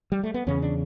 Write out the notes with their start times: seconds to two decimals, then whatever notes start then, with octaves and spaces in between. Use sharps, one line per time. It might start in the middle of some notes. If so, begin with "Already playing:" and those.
0.12 G3
0.23 A3
0.34 B3
0.47 E2 C#3 C#4
0.62 D4